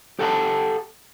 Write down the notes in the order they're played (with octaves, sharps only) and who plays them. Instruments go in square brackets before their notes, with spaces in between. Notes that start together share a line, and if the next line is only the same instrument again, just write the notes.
[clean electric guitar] G4 A4 F#5 G#5 A5